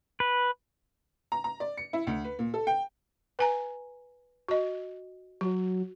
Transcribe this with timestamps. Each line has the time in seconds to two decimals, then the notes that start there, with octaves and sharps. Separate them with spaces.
0.20 B4
1.32 A#5
1.44 A#5
1.60 D5
1.77 C#7
1.93 E4
2.07 D2
2.24 B4
2.39 A#2
2.54 A4
2.67 G5
3.39 B4 G#5 A#5
4.48 F#4 D#5
5.41 F#3 F#4